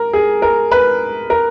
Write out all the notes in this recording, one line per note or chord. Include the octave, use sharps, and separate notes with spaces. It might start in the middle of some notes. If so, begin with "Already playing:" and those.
Already playing: A#4
G#4
A#4
B4
A#4